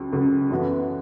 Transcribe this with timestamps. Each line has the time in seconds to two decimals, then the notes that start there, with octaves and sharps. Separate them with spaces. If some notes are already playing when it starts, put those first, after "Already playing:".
Already playing: C#2 C#3 F#3
0.12 C#2 C#3 F#3
0.50 F#2 E3 B3 F#4 A4